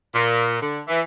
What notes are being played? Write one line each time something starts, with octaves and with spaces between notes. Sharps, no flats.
A#2
D3
E3